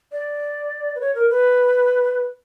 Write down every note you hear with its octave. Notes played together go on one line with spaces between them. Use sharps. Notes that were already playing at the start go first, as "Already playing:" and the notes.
D5
B4
C#5
A#4
B4